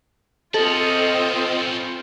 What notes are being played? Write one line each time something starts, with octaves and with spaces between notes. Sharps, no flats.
C4 C#4 E4 F4 A4 D#5